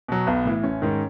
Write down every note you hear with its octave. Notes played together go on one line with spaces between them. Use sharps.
B2 F#3
B1 B3
A2 E3
A1 C#4
G#2 D#3